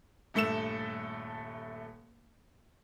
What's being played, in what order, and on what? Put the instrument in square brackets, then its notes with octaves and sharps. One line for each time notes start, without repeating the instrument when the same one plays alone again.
[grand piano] D#1 G2 A3 A4 E6 E7